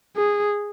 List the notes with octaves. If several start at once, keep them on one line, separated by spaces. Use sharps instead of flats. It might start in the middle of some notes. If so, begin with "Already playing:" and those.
G#4